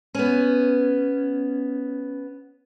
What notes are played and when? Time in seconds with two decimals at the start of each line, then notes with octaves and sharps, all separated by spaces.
0.15 B3 C#4